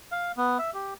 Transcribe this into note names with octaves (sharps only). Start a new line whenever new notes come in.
F5
B3
E5
G4